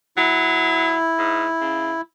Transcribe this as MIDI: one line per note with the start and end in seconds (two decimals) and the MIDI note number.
0.17 0.94 54
0.17 2.01 64
1.18 1.45 44
1.61 1.92 49